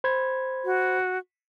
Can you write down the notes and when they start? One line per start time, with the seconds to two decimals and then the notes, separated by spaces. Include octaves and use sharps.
0.04 C5 B5 G#6
0.65 F#4